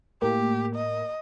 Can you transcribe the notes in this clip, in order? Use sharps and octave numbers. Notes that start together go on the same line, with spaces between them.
A2 A#3 G4
D#5